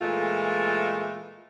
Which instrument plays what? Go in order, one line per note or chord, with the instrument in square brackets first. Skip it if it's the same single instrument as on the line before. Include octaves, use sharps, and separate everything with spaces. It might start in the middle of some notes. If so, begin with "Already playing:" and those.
[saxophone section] A#2 E3 G#3 A3 F4